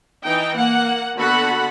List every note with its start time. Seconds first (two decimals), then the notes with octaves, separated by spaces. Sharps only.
0.24 E3 D#4 G5
0.56 A#3 F#5
1.16 D3 B3 F#4 A4 F#5 B5